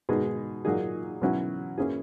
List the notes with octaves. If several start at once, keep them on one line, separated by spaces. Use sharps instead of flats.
B2 G#3 D#4 G#4
A#2 F#3 A#3 D#4 G#4
B2 F#3 C#4 E4
E3 A#3 C#4 E4 G#4